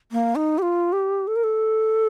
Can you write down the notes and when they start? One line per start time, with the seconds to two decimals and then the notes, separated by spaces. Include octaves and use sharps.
0.12 A#3
0.35 D#4
0.58 G4
0.62 F4
0.93 G4
1.27 A4
1.36 A#4
1.44 A4